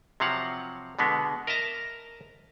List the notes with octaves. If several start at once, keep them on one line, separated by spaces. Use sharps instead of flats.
C3 F3 F#3 F5 F#5
B2 D3 G#3 B3
A#4 D#5 E5 A5 A#5